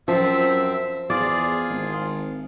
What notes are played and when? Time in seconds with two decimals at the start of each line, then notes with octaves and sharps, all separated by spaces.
0.08 F#2 F3 C4 E5 E6
1.10 E2 F4 G#4 D5
1.69 G#1